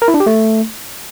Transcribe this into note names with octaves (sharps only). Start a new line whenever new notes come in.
A#4
E4
D4
G4
A3